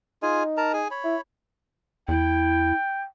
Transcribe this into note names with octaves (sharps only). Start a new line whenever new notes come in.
D#4 F4 G#4 G#5
A#4 A5 A#5
G#4 G#5
C#5 B5
E4
E2 E4 G5